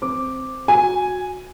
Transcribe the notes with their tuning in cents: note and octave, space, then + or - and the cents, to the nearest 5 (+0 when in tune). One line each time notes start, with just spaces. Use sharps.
C4 +0 D6 +0
F#4 -15 G#5 +0